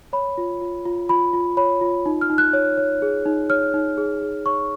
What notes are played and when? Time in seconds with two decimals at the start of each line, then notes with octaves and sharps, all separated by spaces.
0.13 C#5 B5
0.38 F4
0.61 F4
0.85 F4
1.09 F4 B5
1.33 F4
1.57 C#5 B5
1.81 F4
2.06 D#4
2.21 F6
2.30 D#4
2.38 F#6
2.53 C#5
2.77 C#5
3.02 G#4
3.26 D#4
3.50 C#5 F6
3.74 D#4
3.98 G#4
4.22 G#4
4.46 C#5 C#6